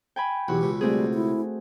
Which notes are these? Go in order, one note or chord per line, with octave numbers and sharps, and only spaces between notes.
G5 G#5 B5
B1 E2 F#4 G4
C#2 B2
G3 A3 C4 G#4
E4